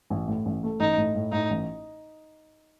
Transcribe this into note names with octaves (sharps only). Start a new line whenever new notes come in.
A1
A2
A1
A3
A1 D#4
A2
A2
A2 D#4
A1